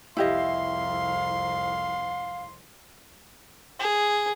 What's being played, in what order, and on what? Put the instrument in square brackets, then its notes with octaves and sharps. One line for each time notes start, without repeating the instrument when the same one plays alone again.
[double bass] C2 F2 [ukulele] E4 G4 D#5 [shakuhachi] F5 [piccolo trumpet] C6
[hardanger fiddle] G#4